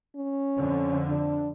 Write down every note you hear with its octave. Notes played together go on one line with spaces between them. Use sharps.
C#4
F2 D3 F3
D4